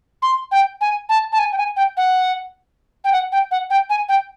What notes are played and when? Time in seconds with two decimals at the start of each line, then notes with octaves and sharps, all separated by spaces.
0.22 C6
0.52 G5
0.81 G#5
1.09 A5
1.32 A5
1.39 G#5
1.52 G5
1.58 G#5
1.77 G5
1.97 F#5
3.05 G5
3.12 F#5
3.32 G5
3.51 F#5
3.70 G5
3.90 G#5
4.09 G5